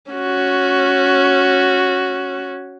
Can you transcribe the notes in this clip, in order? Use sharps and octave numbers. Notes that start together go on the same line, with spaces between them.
C#4 F#4